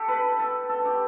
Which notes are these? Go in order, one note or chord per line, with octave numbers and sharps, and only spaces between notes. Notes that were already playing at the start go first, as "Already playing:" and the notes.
Already playing: G4 A4
B4
A4
A4
G4